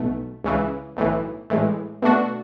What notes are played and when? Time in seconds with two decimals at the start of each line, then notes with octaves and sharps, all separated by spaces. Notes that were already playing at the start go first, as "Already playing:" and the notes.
Already playing: B1 B2 A3
0.44 C#2 C#3 E3
0.97 B1 A2 E3
1.50 A2 E3 G#3
2.02 B2 A3 D4 F#4